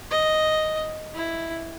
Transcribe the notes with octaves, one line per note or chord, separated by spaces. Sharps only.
D#5
E4